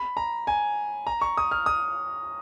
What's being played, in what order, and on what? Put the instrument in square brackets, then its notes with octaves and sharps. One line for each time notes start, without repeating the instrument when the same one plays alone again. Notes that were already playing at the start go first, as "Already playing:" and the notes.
Already playing: [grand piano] B5
A#5
G#5
A#5
C#6
D#6
F6
D#6